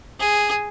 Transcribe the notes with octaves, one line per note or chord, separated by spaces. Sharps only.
G#4